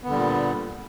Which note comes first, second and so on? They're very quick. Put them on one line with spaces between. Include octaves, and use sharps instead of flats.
B3 D3 G3 A#2